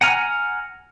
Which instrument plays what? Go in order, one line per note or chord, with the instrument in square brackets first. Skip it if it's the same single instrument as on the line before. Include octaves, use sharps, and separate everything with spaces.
[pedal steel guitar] F#5 G#5 A#5 F6